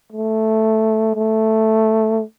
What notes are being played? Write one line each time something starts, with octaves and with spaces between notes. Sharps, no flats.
A3
A3